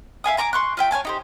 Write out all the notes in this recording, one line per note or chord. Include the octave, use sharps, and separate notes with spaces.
E5 F5 G#5 D#6
G#5 A#5 C#6 D6
C6 C#6 F#6
F4 E5 G5
C#5 F5 G#5 A5
D#4 G4 C5